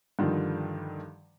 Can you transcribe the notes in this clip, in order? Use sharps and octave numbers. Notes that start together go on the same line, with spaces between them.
G2 D3 D#3 F3 G3